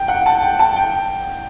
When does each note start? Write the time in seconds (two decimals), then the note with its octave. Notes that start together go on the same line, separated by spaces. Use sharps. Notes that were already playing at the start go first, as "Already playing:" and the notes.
Already playing: G5
0.08 F#5
0.26 A5
0.42 G5
0.59 A5
0.76 G5